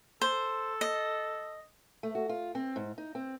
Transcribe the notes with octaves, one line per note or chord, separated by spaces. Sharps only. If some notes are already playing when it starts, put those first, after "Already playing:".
A4 C5
D#5
A3
F#4
F4
C4
G#2
D#4
C4